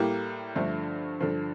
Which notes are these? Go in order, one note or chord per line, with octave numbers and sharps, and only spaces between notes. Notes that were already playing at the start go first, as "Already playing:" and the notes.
Already playing: A2 G3 A#3
G2 D3 F3 A3
G2 D3 F3